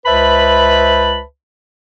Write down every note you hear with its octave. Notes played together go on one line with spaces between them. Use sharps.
C#2 B4 C5 E5 A5 B5